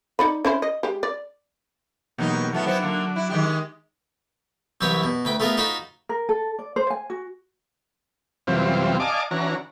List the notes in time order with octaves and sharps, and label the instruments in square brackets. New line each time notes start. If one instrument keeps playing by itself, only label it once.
[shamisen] D#4 D5 B5
C#4 E4 C5
D#5
G#3 G4
D5
[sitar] E2 F#3 D#4 [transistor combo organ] B2 A#3 G4
[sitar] F#3 A3 B3 [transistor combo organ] F4
[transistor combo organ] F#3 D4 [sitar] B3 C4 E4
[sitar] D3 A#3
E4
D#3 G#3 G4
[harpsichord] C2 F#2 E3 E4 B4 C#5
B2
D2 B4 G5
A3 B3 F4 G#4 A#4
D#4 F4 F#4 C5 B5
[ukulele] A#4
A4
D5
C5
G#5
F#4
[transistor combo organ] F#2 C3 E3 G3 C4 F4
D5 D#5 F5 G#5 A5 D6
E3 C#4 D4 F#4 A#5